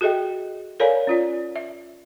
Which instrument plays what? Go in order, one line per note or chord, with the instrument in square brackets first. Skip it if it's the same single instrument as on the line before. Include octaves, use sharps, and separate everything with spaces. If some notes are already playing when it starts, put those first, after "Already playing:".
[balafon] F#4 G#4 A4 D#5 E5 G5
A4 A#4 C#5 D5 F5 G#5
C#4 F4 D5
E5